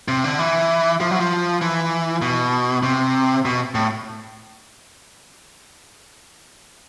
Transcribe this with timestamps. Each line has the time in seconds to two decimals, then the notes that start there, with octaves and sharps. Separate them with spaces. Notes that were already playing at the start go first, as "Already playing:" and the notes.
0.08 C3
0.24 D3
0.39 E3
1.01 F3
1.11 F#3
1.20 F3
1.61 E3
2.22 B2
2.83 C3
3.45 B2
3.75 A2